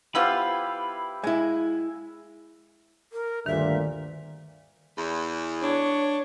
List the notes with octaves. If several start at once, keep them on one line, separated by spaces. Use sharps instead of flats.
F3 B3 E4 F4 G4 B4 F5
G#3 E4 G#5
A#4
D2 G2 A#2 D#3 E5
E2
D4 C#5